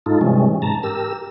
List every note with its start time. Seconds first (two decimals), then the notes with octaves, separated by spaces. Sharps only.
0.06 G#2 D#4 F4 A4
0.21 C3 E3 G3 G#3 C#4
0.62 G#2 A5 A#5
0.83 G4 A#4 E6